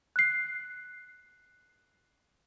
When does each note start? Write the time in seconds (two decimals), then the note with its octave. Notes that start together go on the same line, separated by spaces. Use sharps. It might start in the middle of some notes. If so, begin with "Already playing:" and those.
0.16 F#6 C7